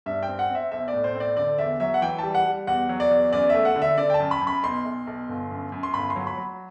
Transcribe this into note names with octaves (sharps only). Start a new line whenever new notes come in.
G2 E5
G5
C4
F#5
C4
E5
B1 E5
D5
A2
C5
C4
D5
D3 D5
E2 E5
F#3 E5
F#5
E3 G5
G3 A5
F#5
G3
E2 F#5
F#3
D5
E2
F#2 D5
A3 E5
F#5
D3
E5
D3 D5
G5
A5
F#2
B5
F#2
B5
B1 C6
B1
B1
G1
F#2
F#2
C6
G1 B5
C6
F#3
B5
F#3